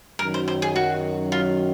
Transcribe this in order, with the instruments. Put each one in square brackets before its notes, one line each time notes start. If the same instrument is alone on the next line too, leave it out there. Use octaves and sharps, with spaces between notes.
[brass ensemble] F#2 D#3 F#3 [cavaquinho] A#4
[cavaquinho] C5
C5
G#4
F#4
F4